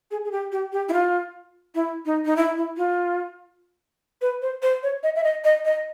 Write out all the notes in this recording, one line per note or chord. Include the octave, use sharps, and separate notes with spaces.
G#4
G#4
G4
G4
G4
E4
F4
E4
D#4
D#4
E4
E4
F4
B4
C5
C5
C#5
D#5
E5
D#5
D#5
D#5